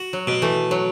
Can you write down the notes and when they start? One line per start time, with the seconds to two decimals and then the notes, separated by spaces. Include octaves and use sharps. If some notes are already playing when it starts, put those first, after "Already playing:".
Already playing: F#4
0.13 F#3
0.27 B2
0.42 E3 A3
0.71 F#3